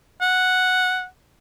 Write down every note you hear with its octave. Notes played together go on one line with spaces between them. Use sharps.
F#5